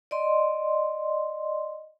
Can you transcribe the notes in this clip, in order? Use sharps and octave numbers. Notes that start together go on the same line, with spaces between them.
D5 D#5 C6